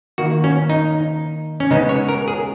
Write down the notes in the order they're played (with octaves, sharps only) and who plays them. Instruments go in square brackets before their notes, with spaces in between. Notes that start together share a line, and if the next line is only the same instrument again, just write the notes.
[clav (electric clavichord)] D#3 A#3 F#4
C#4
D#4
C#4
C#3 G#3 B3 D#4
C#5
A#4
G#4